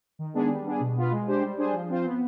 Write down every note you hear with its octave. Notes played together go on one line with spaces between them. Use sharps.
D#3
G#3 B3 D4 G#4
G3
B3 D4 G#4
B2
B3 F4 B4
G#3
D4 G4 C5
G3
D4 G#4 C5
F3
C4 F4 C5
B3